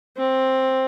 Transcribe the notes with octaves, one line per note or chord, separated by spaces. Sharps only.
C4